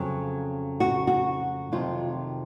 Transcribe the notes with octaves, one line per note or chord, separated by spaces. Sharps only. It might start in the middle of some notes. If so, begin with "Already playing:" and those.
Already playing: F2 C#3 F#3
F#4
F#4
F2 C3 D#3 F#3 F4